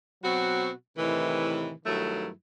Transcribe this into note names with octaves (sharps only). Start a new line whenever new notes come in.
B2 F#3 C4 F#4
A2 C3 D#3 E3
G2 D#3 F#3 A3 E4